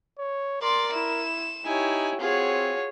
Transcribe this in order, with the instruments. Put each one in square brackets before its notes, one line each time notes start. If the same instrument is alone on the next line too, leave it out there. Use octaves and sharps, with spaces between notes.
[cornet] C#5
[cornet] A#4 [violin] D5 A6 [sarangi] C6
[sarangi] E4 [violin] E7
[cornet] D#4 [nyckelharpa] E4 C#5 [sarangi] G4 [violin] G#5
[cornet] C4 [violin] F4 [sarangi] F#4 [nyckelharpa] G#4 C#5